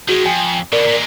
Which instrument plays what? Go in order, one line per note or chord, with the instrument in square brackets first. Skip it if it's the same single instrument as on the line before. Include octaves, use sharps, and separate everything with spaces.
[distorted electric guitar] D#3 G#3 [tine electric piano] F#4 G#4
[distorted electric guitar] F2 [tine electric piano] G5 G#5
[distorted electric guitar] B2 D3 [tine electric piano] A#4 D5
[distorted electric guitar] A#2 G#3